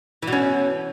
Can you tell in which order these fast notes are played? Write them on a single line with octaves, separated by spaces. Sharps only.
E3 B2 C#4